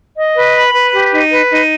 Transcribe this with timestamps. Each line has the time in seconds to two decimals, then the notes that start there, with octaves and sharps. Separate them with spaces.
0.16 D#5
0.36 B4
0.55 B5
0.74 B4
0.93 G4
1.13 D#4
1.32 B4
1.50 D#4